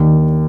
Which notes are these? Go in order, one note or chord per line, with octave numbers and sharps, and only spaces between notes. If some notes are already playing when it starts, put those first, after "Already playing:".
Already playing: D#2